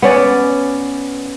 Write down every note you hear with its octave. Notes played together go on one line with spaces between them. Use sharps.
B3 C#4 D5